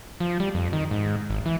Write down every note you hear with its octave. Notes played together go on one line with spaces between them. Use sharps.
F3
G3
F2
D#3
G#2
G#1
E3